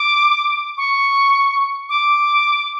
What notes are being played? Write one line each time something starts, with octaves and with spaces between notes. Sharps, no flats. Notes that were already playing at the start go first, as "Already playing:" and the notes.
Already playing: D6
C#6
D6